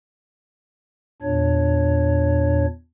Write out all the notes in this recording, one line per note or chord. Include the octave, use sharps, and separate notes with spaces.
E2 A#2 D4 C#5